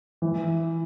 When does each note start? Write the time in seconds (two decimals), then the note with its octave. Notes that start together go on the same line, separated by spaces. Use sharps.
0.22 E3